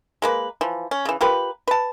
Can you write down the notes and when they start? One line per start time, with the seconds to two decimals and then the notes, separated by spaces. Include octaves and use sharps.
0.22 G#3 A#3 B4
0.61 E3 F3
0.91 C#4
1.05 C#3 E3
1.21 F4 G4 A#4 B4
1.68 B4 A5